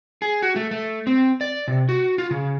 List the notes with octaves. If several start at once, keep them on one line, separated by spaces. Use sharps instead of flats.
G#4
F#4
A3
A3
C4
D5
C3
F#4
F4
C#3